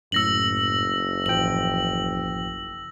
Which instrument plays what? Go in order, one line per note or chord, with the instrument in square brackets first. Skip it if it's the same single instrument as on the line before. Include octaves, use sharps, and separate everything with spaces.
[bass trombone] F#1 [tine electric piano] F#2 A2 [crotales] E6 A#6 F#7
[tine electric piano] A1 F3 G5 [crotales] F#7